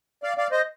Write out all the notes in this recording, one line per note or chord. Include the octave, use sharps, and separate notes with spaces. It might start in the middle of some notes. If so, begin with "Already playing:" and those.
D5 F5
D5 F5
C5 D#5